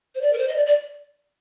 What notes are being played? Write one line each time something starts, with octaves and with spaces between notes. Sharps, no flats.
C5
D5
A#4
C5
D#5
D5
D5